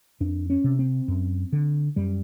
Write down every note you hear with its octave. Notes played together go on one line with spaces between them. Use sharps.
F2 D4
C#4
C3
C4
F#2
D3
F#2 G3